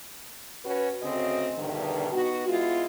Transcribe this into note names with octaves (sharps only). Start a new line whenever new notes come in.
C#4 F#4 B4
D2 C#3 C4 F#4 D#5
E2 G2 B2 D3 D#3
B3 D#4 F#4
G#3 B3 E4 F4